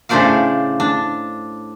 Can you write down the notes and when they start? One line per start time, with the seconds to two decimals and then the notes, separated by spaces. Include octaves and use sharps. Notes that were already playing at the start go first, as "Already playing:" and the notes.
0.09 A2 C#3 D4 C5 D5 F5
0.80 D4